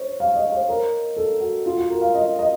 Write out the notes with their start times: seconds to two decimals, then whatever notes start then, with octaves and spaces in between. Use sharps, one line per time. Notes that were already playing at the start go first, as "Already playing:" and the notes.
Already playing: C5 C#5
0.20 F5
0.36 D#5
0.52 C5
0.69 A#4
1.17 A4
1.41 F#4
1.66 F4
1.78 F#4
1.90 A#4
2.01 F5
2.14 D#5
2.39 D#5